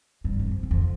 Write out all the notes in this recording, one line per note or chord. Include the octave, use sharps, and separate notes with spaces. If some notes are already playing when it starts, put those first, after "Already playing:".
G2
F2
E2
F2